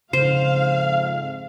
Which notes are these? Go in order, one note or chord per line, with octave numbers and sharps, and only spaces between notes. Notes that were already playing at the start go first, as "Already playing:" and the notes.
F2 G#2 C#3 C5 F5